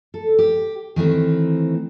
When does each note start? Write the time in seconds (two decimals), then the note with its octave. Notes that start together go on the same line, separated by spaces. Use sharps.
0.14 A4
0.38 G4
0.96 D#3 E3 A3 C4